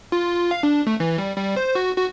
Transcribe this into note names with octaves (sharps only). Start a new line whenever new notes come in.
F4
F5
D4
A3
E3
G3
G3
C5
F#4
F#4